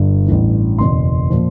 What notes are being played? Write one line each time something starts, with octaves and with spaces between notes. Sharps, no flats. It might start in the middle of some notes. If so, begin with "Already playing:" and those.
Already playing: G1 G2
A1 G2 E3
F#1 E2 B2 C6
A#2 F3